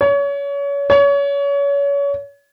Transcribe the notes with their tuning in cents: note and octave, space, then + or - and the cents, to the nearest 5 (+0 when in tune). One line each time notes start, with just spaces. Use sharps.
C#5 +30
C#5 +30